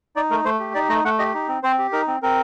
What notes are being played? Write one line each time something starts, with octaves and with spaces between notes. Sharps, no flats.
D#4 D5
A3 A#4
A3 C5
G4
D#4 D5
A3 D#5
A3 F#5
G4 D#5
D#4
C4
C4 C5
G4
D#4 A#4
C4
C4 A#4